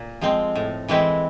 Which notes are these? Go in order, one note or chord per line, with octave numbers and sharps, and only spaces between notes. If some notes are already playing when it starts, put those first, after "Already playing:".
Already playing: A#2
F3 G#3 C4
A2
E3 G#3 C4 E4